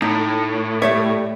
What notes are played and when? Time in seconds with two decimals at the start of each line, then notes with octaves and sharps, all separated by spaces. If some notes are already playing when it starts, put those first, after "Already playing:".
0.02 A2 D#4
0.82 G3 A3 C#5 E5